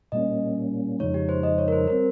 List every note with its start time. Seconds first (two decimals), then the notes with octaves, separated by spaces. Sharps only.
0.12 A#2 G3 A#3 C#4 D#5
0.99 F2 C#3 F3 G#3 D#4 C#5
1.14 G4
1.29 C5
1.43 D#5
1.58 C#5
1.68 A#4
1.72 C5
1.88 G3 C4 A#4